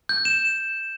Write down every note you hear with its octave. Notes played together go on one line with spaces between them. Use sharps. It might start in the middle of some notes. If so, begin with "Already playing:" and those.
G6
E7